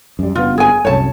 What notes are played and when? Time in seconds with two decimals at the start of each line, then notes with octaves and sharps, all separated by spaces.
0.19 F#2 G3
0.35 F#1 G2 B3 F4
0.58 G#4 G#5
0.85 C2 F#2 A2 C#5 A5